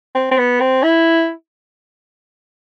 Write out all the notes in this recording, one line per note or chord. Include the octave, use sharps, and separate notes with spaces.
C4
C4
B3
C4
E4